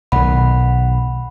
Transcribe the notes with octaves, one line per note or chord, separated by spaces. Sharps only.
B1 D#3 F#5 B5